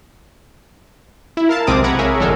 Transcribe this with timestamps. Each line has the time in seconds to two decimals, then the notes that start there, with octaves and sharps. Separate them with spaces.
1.37 E4
1.49 A#4 F5 A5
1.67 B1 C3 G#3 C4 D6 D#6
1.84 F#5 A#5 B5 G#6
1.99 G#4 A#4 C#5 E5 G#5
2.19 G#1 F2 D3 G#3 A4 A#4